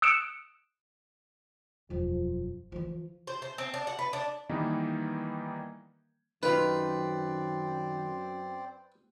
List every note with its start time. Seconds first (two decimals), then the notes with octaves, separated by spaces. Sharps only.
0.02 D#6 E6 F#6 C#7 D7 E7
1.90 E1 F#2 F3
2.72 E3 F3 F4
3.27 C5
3.42 C5
3.58 C4
3.74 D4
3.87 F#5
3.99 B4
4.13 D4
4.49 D#3 E3 G3 A#3 B3 D#4
6.43 F#2 D#3 C4 F4 B4 C5 D5